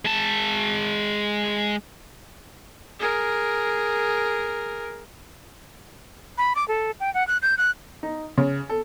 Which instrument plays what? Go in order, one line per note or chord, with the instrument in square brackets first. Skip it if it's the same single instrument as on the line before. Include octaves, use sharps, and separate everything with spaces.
[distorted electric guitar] G#3 A5
[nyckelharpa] G#4 A#4
[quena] B5
D6
A4
G5
F#5
F#6
G6
F#6
[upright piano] D#4
C#3
A4